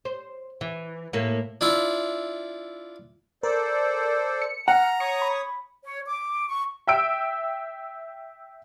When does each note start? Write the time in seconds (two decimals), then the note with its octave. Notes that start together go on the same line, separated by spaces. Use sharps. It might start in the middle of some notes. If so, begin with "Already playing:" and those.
0.05 C5
0.61 E3
1.13 A2 A#3
1.61 D4 E4 F4 E5
3.43 A4 A#4 C5 D5
4.42 C#7
4.68 F#5 A#5 F6
5.00 C#5 C#6 D#6 C#7
5.22 B5
5.84 C#5
6.07 D6
6.47 C#6
6.87 E5 G5 E6 D7